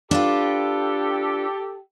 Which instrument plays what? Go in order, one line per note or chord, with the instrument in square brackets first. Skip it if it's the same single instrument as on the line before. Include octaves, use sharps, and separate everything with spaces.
[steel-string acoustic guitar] D4 F4 B4 [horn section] G4 A4